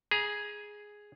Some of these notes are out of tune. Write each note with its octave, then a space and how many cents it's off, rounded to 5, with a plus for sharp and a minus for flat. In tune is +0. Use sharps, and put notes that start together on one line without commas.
G#4 +0 A#5 +35